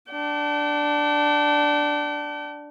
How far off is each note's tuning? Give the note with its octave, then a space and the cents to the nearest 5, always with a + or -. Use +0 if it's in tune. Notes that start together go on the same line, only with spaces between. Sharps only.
D4 +0 G5 -40